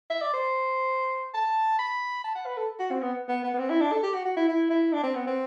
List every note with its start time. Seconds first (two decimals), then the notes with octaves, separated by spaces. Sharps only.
0.10 E5
0.21 D5
0.34 C5
1.34 A5
1.79 B5
2.24 A5
2.35 F#5
2.46 B4
2.57 A4
2.79 F#4
2.91 C4
3.02 B3
3.28 B3
3.44 B3
3.54 B3
3.58 C4
3.70 E4
3.81 D4
3.92 A4
4.03 G4
4.14 F#4
4.25 F#4
4.37 E4
4.48 E4
4.70 E4
4.93 D4
5.03 C4
5.15 B3
5.27 C4